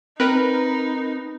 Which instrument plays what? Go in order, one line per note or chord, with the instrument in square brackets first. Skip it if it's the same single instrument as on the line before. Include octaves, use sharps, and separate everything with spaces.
[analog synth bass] C4 [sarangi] D#4 [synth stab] A#4 B4